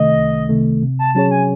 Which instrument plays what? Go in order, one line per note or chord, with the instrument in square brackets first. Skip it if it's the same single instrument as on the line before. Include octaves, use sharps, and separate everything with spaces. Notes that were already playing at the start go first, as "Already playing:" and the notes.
Already playing: [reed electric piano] C2 C3 D#3 A3 [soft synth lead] D#5
[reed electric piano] C2
C3 D#3 A3
C3
[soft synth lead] A5
[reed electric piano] F#3 C#4 G#4 C#5 [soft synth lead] A5
[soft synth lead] G#5